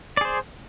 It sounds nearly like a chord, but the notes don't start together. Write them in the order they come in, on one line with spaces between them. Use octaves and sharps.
D5 G#4 C5